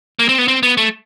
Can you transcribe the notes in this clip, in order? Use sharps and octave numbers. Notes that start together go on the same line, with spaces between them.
A#3
C4
B3
C4
B3
A3